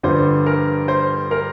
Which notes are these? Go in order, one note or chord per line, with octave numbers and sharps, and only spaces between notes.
G2 D3 F3 C5
A#4
C5
A#4